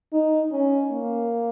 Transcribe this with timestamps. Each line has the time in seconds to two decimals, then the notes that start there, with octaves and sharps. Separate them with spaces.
0.13 D#4
0.52 C#4
0.91 A#3